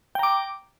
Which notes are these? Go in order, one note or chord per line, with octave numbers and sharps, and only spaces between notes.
G5 A#5 D6